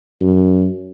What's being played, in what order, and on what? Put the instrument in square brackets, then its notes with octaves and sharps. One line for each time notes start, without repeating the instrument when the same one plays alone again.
[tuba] F#2